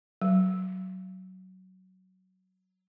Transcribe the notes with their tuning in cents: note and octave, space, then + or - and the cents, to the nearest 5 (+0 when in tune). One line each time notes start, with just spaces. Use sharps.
F#3 +15